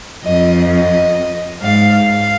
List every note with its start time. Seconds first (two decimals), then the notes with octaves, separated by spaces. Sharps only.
0.24 F2 D#5
0.70 D#5
1.62 G#2 F5
2.08 F5